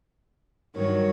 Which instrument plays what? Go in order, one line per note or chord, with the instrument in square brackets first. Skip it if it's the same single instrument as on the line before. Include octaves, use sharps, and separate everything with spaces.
[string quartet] G2 D#3 F#3 C#5